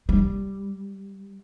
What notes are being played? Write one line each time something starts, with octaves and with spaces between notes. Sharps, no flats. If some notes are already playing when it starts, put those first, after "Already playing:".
G3